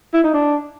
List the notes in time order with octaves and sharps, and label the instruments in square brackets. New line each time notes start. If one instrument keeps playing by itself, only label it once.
[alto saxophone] E4
D#4
D4